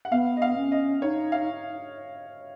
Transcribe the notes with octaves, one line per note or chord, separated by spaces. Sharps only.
F#5
B3 F5
D#5
F5
C#4
D#5
D#4 C#5
F5